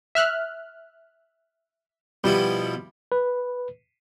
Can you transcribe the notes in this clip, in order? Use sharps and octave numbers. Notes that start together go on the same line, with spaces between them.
E5 F6 F#6
B2 F3 G3 E4
B4